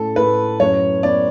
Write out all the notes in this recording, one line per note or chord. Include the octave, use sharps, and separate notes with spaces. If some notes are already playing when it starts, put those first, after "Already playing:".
Already playing: A2 C#4 A4
A2 B4
F#2 C#5
B3 D5